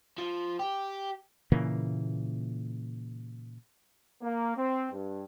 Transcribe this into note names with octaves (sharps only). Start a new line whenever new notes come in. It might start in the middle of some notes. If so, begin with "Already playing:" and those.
F3
G4
A#2 C#3 E3 A#3
A#3
C4
G2